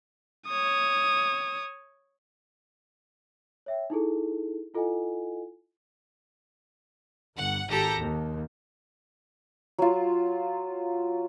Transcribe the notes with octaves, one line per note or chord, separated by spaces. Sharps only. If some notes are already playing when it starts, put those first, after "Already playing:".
C#5 D#6
C#5 E5 G5
D#4 E4 G#4 A4
E4 F4 A4 D#5 F#5 G#5
G1 F#5
G#1 G4 A4 A#5
D#2
F#3 F4